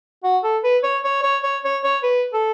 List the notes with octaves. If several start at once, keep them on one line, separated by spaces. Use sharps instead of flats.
F#4
A4
B4
C#5
C#5
C#5
C#5
C#5
C#5
B4
A4